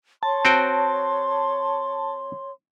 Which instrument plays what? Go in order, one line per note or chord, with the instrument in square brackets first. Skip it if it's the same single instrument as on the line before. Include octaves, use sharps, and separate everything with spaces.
[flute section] C#5 C6 [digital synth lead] A5
[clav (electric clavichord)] C4 F#4 G5